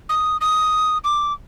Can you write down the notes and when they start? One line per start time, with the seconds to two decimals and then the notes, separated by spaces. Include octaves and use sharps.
0.09 D#6
0.41 D#6
1.04 D6